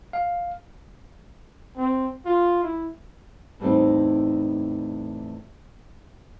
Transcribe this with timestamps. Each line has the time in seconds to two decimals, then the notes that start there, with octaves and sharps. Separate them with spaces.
0.13 F5
1.77 C4
2.26 F4
2.63 E4
3.60 E2 A2 G3 B3 C4 D#4